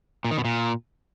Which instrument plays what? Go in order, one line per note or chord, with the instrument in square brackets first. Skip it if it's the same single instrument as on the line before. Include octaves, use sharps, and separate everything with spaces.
[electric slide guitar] A#2
D#3
B2
A#2